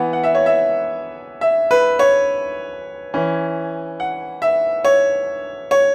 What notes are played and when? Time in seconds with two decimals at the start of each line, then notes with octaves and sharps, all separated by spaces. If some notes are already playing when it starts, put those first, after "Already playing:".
Already playing: E3 B3 F#5
0.13 F#5
0.24 E5
0.35 C#5
0.46 E5
1.41 E5
1.71 B4
1.99 C#5
3.14 E3 C#4
4.00 F#5
4.42 E5
4.84 C#5
5.71 C#5